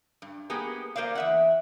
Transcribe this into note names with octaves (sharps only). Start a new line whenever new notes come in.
G2
A#3 B3 G4 G#4
A#3 A#4 C5 D5 F5
E2 E5 F#5